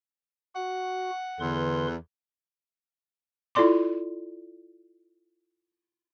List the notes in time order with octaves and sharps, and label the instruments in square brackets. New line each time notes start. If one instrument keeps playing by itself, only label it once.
[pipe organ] F#4 [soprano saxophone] F#5
[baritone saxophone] E2 [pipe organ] D3 B4 C6
[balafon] E4 F4 A4 D5 C6 D6